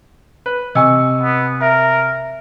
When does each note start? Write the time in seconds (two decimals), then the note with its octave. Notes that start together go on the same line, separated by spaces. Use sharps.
0.46 B4
0.75 C3 D#5 G#5 C#6 E6 C#7
1.21 B3
1.61 A#4 E5